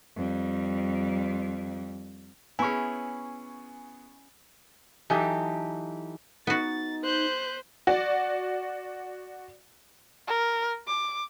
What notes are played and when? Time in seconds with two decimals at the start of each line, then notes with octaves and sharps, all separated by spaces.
0.16 F2 G3
2.59 B3 C#4 E4 G#4 G#5 C#6
5.10 E3 F#3 D#4 G4 A4
6.47 B3 D#4 F#4 A6
7.04 B4 C5 F#6 G6
7.87 F#4 D5
10.27 A#4
10.87 D6